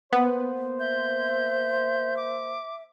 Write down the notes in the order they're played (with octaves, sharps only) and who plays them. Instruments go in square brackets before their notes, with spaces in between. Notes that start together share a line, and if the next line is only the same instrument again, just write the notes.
[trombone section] A#3 C5 [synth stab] B3
[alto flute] E5 [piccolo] G6
[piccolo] D6